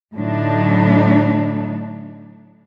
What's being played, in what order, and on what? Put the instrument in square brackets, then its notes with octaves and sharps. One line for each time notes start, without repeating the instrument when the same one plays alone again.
[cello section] A2 D3 F#3 D4 D#4